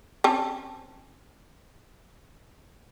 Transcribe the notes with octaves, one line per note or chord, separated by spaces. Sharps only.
C4 C#4 A5